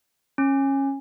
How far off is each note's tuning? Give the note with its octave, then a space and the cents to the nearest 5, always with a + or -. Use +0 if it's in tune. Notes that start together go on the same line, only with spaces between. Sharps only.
C#4 -20